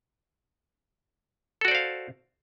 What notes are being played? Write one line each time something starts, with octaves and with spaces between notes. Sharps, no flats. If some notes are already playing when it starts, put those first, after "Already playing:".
F#4 A4 C5 D5 F5